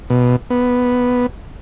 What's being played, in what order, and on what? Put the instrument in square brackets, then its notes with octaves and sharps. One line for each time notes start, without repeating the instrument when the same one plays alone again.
[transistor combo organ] B2
B3